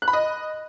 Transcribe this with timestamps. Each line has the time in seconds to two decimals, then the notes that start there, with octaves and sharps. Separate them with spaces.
0.02 F#6
0.08 B5
0.13 D#5